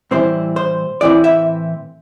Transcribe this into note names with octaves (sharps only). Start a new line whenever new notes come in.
A2 E3 G3 C4 E4 C5
C5
A2 E3 G3 C4 E4 D5
E5